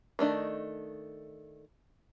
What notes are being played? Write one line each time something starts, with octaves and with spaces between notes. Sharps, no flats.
D#3 A3 D4 D#5